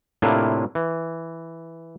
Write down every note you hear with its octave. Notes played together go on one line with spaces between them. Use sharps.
A2 C3 A#3 D4 E4 F4
E3